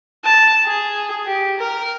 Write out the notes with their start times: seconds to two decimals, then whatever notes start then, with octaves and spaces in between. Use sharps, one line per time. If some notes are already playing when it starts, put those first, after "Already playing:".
0.24 A5
0.65 G#4
1.27 G4
1.59 A#4